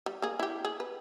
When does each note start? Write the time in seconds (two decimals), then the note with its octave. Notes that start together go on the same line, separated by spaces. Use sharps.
0.06 G3
0.22 A#3 G#4
0.39 E4 G4
0.65 G#4
0.80 B4